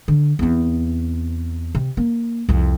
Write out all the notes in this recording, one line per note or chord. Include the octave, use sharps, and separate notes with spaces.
D3
E2 C4
C3
A#3
C2 F2